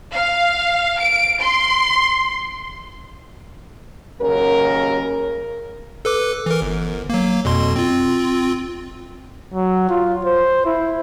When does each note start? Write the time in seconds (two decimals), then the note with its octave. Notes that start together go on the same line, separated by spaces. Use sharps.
0.13 F5
1.00 D7
1.41 C6
4.21 D#2 C#3 F#3 C#4 A#4
6.05 A4 B4 D6
6.46 E3 A#4
6.61 G1
7.10 F#3 A#3
7.45 F2 B2 C6
7.76 C4 F4
9.54 F#3
9.89 F4
10.25 C5
10.65 E4